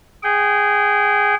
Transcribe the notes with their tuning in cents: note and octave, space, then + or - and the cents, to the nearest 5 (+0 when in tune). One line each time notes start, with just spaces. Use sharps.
G#4 -10 G5 -30